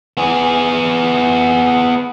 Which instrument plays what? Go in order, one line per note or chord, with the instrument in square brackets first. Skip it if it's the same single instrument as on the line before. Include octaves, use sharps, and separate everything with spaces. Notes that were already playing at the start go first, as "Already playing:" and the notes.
[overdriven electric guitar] B3 G#4